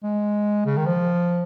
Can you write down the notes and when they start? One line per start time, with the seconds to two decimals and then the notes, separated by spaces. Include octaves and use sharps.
0.04 G#3
0.66 C#3
0.77 D#3
0.87 F3